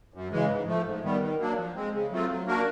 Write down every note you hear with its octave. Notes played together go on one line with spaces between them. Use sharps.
F#2
C#3 E3 G#3
G#2
F3 A3
G#2
D#3 G3 B3
D#3
F#3 A#3 D4
F3
G#3 C4
C#3
F#3 A3 C4 F4
F#3
A#3 D4 F#4 A#4